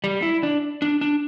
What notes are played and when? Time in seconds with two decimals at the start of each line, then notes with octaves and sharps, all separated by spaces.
0.04 G3
0.22 E4
0.43 D4
0.82 D4
1.01 D4